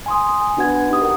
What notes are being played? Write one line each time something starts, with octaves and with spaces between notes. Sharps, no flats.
G#5 C6 D#6
G#5
B3 D4 F#4 B4 F#5 G#6
D#4 G4 D#6
A#4 F#5